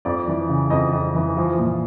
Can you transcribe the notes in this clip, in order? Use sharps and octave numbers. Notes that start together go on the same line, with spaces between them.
F2 D5
E3
C#3
F2 D#5
F2
E3
F3
A#2